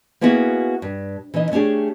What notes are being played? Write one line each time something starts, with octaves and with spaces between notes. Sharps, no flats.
A#3 B3 C#4 E4 F#4 G#4
G2
E3 C#4 D#4 D#5
A3 C#4 D4 G4 G#4